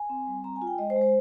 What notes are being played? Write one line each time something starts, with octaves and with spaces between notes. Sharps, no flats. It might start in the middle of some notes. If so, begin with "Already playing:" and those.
Already playing: G#5
C4
G3
C4 A#5
G#5
F4
G5
G#3 D#5
C5
G#3
C5